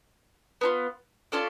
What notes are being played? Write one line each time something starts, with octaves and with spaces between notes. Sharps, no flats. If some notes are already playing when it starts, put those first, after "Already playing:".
B3 D4 F4
C#4 F4 A4 D5